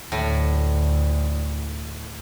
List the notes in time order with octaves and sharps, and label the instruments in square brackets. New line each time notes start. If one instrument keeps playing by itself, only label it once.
[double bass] D2 [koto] A2